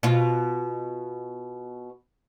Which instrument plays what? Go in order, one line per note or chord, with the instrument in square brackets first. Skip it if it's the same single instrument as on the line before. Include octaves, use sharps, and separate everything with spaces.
[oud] B2 F4